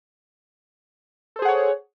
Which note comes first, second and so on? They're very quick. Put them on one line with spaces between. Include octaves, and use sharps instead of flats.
A4 C5 G#4 F#5 C#5